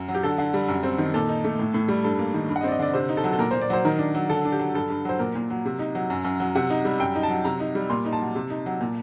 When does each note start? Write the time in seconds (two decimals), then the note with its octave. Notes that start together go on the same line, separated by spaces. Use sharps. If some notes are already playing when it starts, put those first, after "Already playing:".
Already playing: F#2
0.08 F#3
0.15 G4
0.23 D3 A4
0.38 D3
0.54 G3
0.68 F#2
0.83 C4
0.98 D#3
1.14 A#2 A4
1.29 D#4
1.44 A3
1.59 A2
1.74 A2
1.88 G3
2.04 G2 A4
2.19 A#3
2.34 D#3
2.49 G2
2.56 F#5
2.61 D#5
2.64 C4 D5
2.72 D#5
2.79 D3 D5
2.94 C3 C5
3.09 D#4
3.17 A4
3.24 F#3
3.33 A4
3.39 A#2 A#4
3.51 A#2 C5
3.61 D5
3.70 F#3 C5
3.85 D#3 A#4
3.99 D4
4.15 F#3
4.29 D3 A4
4.45 D4
4.52 G4
4.59 F#3
4.74 G2 A4
4.90 G2
5.05 F#3 C5
5.19 A#2 A#4
5.35 A#2
5.50 F#3
5.65 C3
5.79 D#4
5.95 F#3
6.10 F#2
6.25 F#2
6.40 F#3
6.55 C3 F#5
6.70 D#4
6.85 G3
7.00 F#2 G5
7.15 D#4
7.23 A5
7.30 F#3
7.45 C3 A#5
7.60 D#4
7.75 G3
7.90 A#2 C6
8.05 D#4
8.13 A5
8.21 F#3
8.35 C3
8.50 D#4
8.66 F#3
8.81 A#2